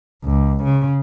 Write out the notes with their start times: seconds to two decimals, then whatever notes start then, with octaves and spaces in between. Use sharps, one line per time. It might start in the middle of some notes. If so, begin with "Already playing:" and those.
0.24 C#2
0.64 C#3